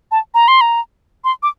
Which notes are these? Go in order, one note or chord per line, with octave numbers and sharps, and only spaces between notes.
A5
A#5
C6
A#5
C6
D6